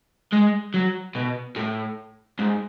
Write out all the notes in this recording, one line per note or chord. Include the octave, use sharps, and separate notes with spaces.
G#3
F#3
B2
A2
G#2